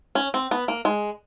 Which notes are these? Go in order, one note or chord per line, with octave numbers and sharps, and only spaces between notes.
C#4
C4
B3
A#3
G#3